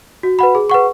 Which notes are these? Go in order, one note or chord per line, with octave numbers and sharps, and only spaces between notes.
F#4
B4 F#5 B5
G#4
B4 F#5 C#6